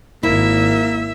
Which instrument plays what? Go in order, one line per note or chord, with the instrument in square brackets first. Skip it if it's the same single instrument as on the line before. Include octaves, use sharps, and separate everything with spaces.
[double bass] G#1 [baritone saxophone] A#3 [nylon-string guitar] E4 [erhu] E5